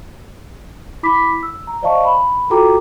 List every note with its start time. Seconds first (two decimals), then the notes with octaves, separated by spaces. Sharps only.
1.03 E4 B5 D6 B6
1.43 E6
1.67 A#5
1.82 C5 D5 D#5 F5 A5 C#6
2.05 B5
2.50 F4 F#4 A4 G5 A#5 D6